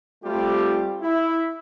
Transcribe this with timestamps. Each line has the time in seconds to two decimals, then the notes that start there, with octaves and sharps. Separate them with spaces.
0.24 G3 A3 C4 F4 G4
1.02 E4